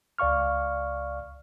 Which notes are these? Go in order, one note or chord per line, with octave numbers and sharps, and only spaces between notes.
C#2 D5 F5 C#6 F6